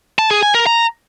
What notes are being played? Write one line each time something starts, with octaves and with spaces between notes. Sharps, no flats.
A5
G#4
G#5
A#4
A#5